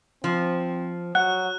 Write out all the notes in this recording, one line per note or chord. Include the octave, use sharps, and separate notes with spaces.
F3 C4
F#3 F#5 F#6